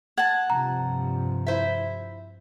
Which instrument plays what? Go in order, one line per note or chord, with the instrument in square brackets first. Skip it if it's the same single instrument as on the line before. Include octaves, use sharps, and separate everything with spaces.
[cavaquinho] F#5 A5 [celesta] G#6
[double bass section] G2 C3 F3 [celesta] A#5
[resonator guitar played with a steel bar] E4 C5 E5